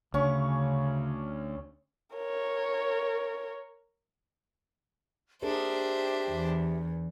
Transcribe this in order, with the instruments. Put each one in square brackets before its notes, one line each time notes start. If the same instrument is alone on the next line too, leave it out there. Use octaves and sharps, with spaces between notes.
[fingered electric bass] D2 [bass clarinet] C#3 [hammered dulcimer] C#4 C#6
[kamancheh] A#4 C#5
[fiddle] D4 C5 [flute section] G4 E5 [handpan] G#4 A#4
[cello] E2